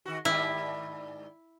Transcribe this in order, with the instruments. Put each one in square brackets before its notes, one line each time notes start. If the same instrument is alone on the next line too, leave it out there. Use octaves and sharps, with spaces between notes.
[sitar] D#3 F#4
[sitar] G#2 D#3 G3 [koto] E4